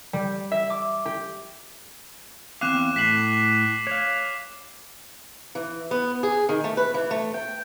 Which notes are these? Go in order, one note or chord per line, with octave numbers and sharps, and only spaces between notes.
G3
E5
D6
G4
E2 C4 F5 D6 F#6 E7
A2 B6 C7 F#7
C#5 F5
E3
B3
G#4
D#3
A3
B4
E3
A3
G5